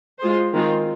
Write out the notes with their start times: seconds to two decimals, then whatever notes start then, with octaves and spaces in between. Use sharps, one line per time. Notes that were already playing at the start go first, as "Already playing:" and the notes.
0.19 G#3 F4 G#4 C5
0.52 D#3 G#3 C4 F4